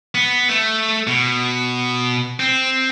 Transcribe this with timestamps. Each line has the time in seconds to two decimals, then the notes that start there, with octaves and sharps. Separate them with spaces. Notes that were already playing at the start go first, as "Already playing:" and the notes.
0.15 B3
0.49 A3
1.07 B2
2.40 C4